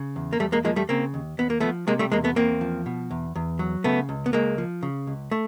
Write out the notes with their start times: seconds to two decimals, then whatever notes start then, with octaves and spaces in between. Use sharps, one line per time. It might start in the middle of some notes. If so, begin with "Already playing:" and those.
Already playing: C#3
0.16 E2
0.33 A#3
0.39 E2 G3 A3
0.52 G#3 A#3
0.64 F3 G#3 A#3
0.76 G3 A3
0.89 C#3 A#3 C4
1.14 D#2
1.38 D#2 B3
1.50 A#3
1.60 F3 A3 B3
1.87 C3 G#3 A#3
1.99 G3 A3
2.12 E2 G#3 A#3
2.24 A3 B3
2.36 E2 A#3 C4
2.61 F3
2.86 B2
3.11 E2
3.36 E2
3.59 F#3
3.84 C#3 A3 B3
4.09 C#2
4.26 B3
4.33 C#2 G#3 A#3
4.58 F3
4.83 C#3
5.07 C#2
5.31 A3